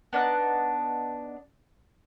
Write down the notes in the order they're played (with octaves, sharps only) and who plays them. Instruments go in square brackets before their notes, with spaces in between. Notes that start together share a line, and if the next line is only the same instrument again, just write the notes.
[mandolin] B3 D4 D#4 F#6